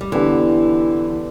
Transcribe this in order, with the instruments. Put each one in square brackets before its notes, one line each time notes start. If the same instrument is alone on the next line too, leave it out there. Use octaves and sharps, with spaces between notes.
[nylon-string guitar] G3
[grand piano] D3 B3 D4 G4 [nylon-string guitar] E3